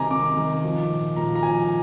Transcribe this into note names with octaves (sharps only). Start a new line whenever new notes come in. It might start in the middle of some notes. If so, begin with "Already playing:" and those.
Already playing: C3 D#3 G#5 A#5 D6
C3 D6
D#3
F3
A#2
A#2 A#5
A#5
F3 G#5